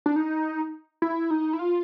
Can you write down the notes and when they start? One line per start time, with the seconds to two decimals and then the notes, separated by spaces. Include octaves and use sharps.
0.06 D4
0.16 D#4
1.02 E4
1.31 D#4
1.53 E4
1.59 F4